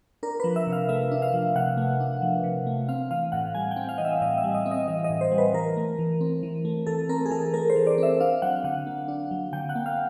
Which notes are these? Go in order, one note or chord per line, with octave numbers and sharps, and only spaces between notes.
D4 A#4
F3 B4
E5
C3
F5
A3 E5
D4
F5
F3
C3 F#5
A3
D4
F3
C3
A3
C4 F5
E3 F5
A2 F#5
G3 G#5
G5
C4
F5
E3 D#5
E5
A2 D#5
E5
G3
D#5
C4
D#5
E3 D#5
D#5
A2
C5
G3
B4
E3 A#4
A3
E3
C4
E3
A3
E3 A4
C4 A#4
G#4
E3 A4
A3 A#4
C5
E3
D5
C4 E5
D4 F5
F#3 F#5
D3 F#5
A#3
D4
F#3
D3 G5
F#5
A#3
F5